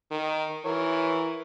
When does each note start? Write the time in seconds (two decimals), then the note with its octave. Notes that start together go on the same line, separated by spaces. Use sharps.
0.11 D#3
0.65 E3 A#4 C#5